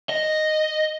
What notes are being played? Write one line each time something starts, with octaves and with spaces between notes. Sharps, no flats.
D#5